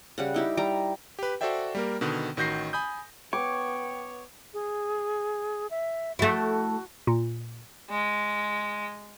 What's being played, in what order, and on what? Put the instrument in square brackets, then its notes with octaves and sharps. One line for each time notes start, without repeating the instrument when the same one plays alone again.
[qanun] C#3 G3 F#5
D#4 E4 G4
G3 G5 A#5
[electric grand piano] G4 B4
F#4 A4 C5 D5 E5 G5
G3 A#3 A#4
B2 D3 D#3 B3
A1 D#3 F#4 G6 A#6 C7
G#5 B5 D#6 G6
[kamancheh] B3 [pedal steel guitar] C#5 [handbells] G5 [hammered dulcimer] D6
[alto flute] G#4
E5
[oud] A3 E4 [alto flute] F#4
[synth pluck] A#2
[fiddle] G#3